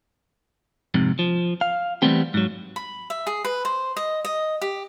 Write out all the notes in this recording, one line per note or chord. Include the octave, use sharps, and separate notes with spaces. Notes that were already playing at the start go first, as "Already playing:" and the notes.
F2 G#2 C3
F3
F5
E3 G3 A3 B3 C4 G4
G#2 F#3
B5
E5
G#4
B4
C5
D#5
D#5
G4